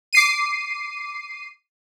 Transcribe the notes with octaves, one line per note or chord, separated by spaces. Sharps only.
D6 C7 D#7